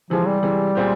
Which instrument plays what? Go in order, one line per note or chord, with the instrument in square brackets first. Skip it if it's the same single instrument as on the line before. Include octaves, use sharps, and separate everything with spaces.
[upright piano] C3 E3 G#3 [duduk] F3
[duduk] G3
[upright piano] C3 E3 G#3
A#2 G#3 C4 G4